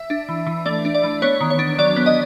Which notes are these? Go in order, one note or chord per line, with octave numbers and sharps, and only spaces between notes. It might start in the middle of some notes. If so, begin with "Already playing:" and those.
Already playing: E5
D4
E3
E3
A3 D5
D4
D5
E3
B3 C#5
D#3
C#5
D4
F#3 D5
B3
D#5